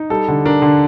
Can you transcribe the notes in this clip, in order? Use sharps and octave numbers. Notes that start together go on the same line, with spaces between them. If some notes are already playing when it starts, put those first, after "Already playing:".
Already playing: D#4
G3 A4
D3
D4 A#4
D3